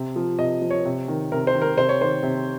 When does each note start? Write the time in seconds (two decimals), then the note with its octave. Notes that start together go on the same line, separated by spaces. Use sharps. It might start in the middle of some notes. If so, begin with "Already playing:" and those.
Already playing: C3
0.16 F3
0.39 C3 D#5
0.62 F3
0.71 C#5
0.85 C3
1.08 D#3
1.32 C3 A#4
1.47 C5
1.55 D#3
1.62 A#4
1.77 C3 C5
1.89 C#5
2.01 D#3 C5
2.23 C3